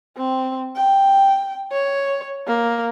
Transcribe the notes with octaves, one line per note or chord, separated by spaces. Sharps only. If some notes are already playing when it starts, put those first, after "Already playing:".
C4
G5
C#5
A#3